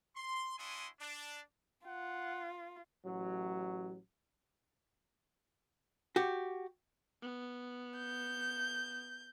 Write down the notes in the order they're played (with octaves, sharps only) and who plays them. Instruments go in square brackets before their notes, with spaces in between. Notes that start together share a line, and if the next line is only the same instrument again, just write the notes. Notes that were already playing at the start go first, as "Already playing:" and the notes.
[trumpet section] C6
D4 E4 F#4 G#5 C6 D#6
D4
[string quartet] F4 [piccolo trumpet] F#5
[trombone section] A1 F#3
[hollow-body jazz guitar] F#4 G4
[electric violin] B3
[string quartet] G6